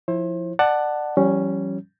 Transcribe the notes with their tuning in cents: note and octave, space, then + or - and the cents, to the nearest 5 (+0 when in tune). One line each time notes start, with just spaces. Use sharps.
F3 +0 E4 +5 C5 +30
D5 +25 F#5 +5 A5 +0
E3 +45 G3 -25 C#4 +0